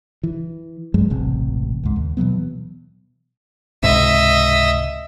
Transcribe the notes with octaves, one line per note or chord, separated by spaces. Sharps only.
E3
G2 F#3 G#3
E1 A1 C3
C#2 G#2
D#2
B2 E3 F#3 B3
C#2 G#2 C3 D#5 E5